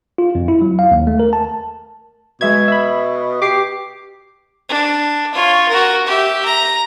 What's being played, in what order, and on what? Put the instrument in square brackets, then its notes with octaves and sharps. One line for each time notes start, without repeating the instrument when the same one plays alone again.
[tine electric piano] F4
F2
E4
F#3
F5
D#2
A3
A#4
A5
[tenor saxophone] B2 [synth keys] G#3 E5 G#6
[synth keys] E5 B5
[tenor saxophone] G4 [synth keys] D6 C7
[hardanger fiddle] D4
F4 C#5
F#4 A#4
G4 E5
A#5